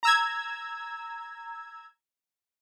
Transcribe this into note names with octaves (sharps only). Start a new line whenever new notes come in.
A#5 E6 G#6